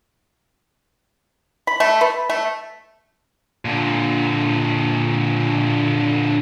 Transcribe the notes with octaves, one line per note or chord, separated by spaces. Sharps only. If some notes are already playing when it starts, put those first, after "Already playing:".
B5
A3
B4
A3
A#2 D3